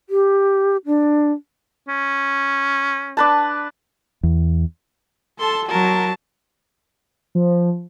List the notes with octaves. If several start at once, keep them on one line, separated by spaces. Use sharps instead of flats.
G4
D4
C#4
D4 B4 A5
E2
A4 A5 C6
F#3 A#4 A5
F3